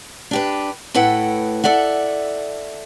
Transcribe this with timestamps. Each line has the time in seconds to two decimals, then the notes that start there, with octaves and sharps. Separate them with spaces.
0.31 D4 G4 B4
0.94 A2 A4 B4 F#5 G5
1.64 A4 D5 E5 F#5